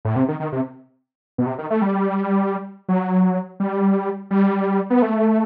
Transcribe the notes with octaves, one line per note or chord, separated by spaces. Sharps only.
A2
C3
D#3
D#3
C3
B2
C3
D#3
A3
G3
F#3
G3
G3
B3
A3